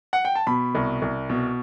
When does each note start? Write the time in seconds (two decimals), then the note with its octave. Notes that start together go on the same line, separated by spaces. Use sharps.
0.13 F#5
0.25 G5
0.35 A5
0.47 B2 B5
0.75 C2
1.02 C2
1.30 B2